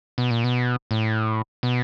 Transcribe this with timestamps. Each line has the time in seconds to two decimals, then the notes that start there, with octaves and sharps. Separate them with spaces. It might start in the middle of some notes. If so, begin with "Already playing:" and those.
0.18 B2
0.31 A#2
0.44 B2
0.91 A2
1.63 B2